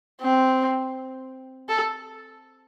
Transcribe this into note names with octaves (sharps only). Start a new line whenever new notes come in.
C4
A4